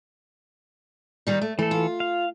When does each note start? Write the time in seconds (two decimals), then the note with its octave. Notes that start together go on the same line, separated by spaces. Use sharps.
1.27 D#3 G3 D#4
1.42 A3
1.59 E3 A3 A4
1.71 F4
2.00 F5